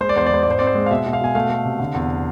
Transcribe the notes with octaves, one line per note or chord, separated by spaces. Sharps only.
G#3 C5
D5
E2 C5
D5
G#3 C5
G#2 D5
C5
C4 D5
C5
G#3
F5
B2 E5
B2
F5
B2 G#5
A3 F5
A3
C3
D3
E2